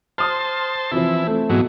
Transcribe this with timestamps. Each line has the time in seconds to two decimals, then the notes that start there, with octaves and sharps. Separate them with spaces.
0.18 C5 A5 C6 D#6 F6
0.91 C3 E3 F3 E4
1.23 A3 C4
1.49 G#2 B2 E3 F#3